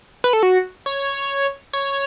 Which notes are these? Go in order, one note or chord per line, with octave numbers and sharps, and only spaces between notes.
B4
A4
F#4
C#5
C#5